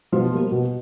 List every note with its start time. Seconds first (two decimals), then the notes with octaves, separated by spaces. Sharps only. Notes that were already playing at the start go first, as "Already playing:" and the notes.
0.12 B2 F3 F4
0.32 G3 A#3
0.51 B2